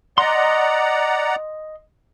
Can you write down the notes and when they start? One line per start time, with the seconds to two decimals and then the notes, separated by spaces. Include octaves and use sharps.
0.18 D5 D#5 F#5 A#5 C6